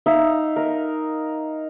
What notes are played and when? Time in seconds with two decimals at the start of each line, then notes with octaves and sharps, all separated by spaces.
0.06 D#4 E5 F5
0.56 A#4 D#5